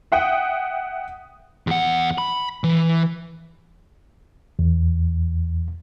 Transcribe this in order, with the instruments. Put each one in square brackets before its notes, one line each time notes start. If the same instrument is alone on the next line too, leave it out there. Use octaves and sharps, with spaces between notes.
[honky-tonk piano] E5 F#5 G5 D#6
[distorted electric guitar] E2 F#5
B5
E3
[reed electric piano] E2